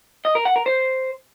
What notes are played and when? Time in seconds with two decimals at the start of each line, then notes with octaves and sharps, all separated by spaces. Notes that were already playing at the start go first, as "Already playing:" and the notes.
0.25 D#5
0.35 A#4
0.45 F#5
0.56 A#4
0.66 C5